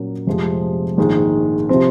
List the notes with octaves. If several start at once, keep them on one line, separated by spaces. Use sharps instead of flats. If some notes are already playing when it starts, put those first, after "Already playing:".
Already playing: A#2 F#3 A#3 C#4
F1 F2 C3 F3 G#3
A#1 G#2 D#3 G#3
C3 F3 C4